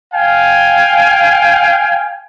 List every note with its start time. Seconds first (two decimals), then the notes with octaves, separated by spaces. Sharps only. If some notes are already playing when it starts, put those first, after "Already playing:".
0.13 F5 G5 G#5